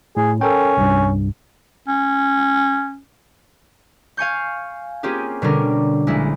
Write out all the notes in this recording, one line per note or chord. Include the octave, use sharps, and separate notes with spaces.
A2 G#4
C#4 A4 A#4 G5
C2 G2
C#4
F5 G#5 C#6 G6
A#3 C4 C#4 F4 G4 G#4
B2 D3 G3 C#4 D4 A#4
A#1 G#3 E4